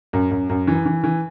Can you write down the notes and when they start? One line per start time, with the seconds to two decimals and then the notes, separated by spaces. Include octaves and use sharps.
0.13 F#2
0.31 F#2
0.49 F#2
0.67 E3
0.86 E3
1.04 E3